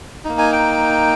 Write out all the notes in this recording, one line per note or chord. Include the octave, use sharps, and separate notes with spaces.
A#3 D#4
G#5
G5